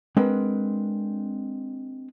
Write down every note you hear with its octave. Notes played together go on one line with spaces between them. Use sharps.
G#3 C4 D4 A#4 B4 F#5